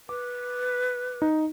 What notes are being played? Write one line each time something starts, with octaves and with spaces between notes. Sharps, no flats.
B4 D6
D#4